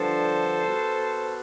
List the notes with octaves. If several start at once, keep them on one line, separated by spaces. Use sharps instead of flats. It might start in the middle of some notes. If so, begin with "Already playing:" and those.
Already playing: G2 D3 F3 A4 C5
B2